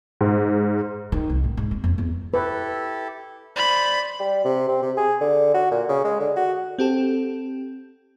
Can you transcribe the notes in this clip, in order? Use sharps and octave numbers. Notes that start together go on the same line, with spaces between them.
G#2
D#3
C2
A2
G#2
C4
F2
E2
E4 G4 A4 B4
C5 D5 B5
G3
C3
C4
C3
G#4
D3
F#4
A#2
C#3
G#3
D3
F#4
C4 G4 A4